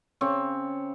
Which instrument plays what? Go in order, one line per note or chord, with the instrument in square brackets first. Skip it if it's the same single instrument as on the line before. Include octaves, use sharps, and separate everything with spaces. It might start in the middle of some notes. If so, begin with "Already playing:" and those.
[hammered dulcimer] C#3 C4 C#5